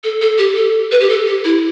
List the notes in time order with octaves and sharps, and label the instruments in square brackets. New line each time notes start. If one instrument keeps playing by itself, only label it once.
[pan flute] A4
A4
G4
A4
B4
G4
A4
G4
E4